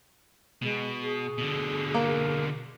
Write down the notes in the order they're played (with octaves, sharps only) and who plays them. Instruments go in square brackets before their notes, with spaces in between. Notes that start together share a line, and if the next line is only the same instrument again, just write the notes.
[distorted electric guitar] B2 [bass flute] G#3
[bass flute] G#4
[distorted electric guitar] B2 D3
[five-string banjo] A#3